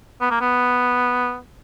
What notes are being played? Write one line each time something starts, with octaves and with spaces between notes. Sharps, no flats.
B3
A#3
B3